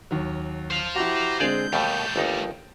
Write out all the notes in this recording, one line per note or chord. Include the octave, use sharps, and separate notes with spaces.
D#2 F#3
C5 F5
E4 F#4 G4 A#5
D3 G#3 C4 G#4 C5 D5 G6
D#2 B2 G3 A3 G5
G1 D#2 D#4